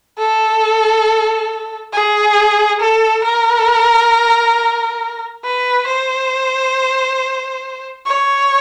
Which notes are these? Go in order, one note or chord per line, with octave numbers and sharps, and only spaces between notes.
A4
G#4
A4
A#4
B4
C5
C#5